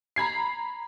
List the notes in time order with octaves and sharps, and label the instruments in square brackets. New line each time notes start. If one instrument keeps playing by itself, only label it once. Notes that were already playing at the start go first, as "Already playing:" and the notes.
[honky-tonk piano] A#5 B5 G#6 C7